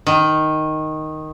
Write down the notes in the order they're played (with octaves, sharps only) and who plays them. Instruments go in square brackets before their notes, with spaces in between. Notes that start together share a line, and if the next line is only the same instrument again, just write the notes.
[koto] D#3